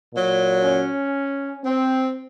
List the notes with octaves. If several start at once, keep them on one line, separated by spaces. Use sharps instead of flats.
A#2 F#3
C#4
C4